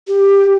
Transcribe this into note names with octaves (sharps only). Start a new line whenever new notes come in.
G4